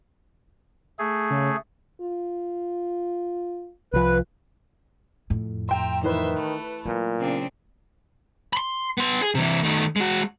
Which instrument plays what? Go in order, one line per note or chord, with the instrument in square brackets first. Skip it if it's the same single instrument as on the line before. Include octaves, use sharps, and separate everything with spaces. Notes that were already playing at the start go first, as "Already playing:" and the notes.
[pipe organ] A3 G#4
[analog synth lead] C#3
[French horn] F4
[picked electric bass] C2 F3 [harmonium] B4
[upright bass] F2 A2
[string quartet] E5 A#5 [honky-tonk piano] G5 C6
[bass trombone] D#3 [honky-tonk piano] E3 B4 [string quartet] C5 E5
[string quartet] A3
[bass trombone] A#2 [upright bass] F#3 A3
[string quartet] C#3 C4 D4
[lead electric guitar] B5 C6
B3 C6
G#4
C3 E3
D#3 A3
G#3 F#4